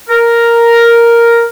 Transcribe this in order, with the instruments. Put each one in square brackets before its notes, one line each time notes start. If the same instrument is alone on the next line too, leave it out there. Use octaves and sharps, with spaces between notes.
[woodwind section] A#4